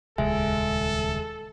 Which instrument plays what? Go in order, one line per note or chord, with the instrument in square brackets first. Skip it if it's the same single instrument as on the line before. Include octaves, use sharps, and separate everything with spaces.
[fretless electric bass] D#1 C#2 [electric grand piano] G#3 [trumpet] A4 [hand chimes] E5 G#5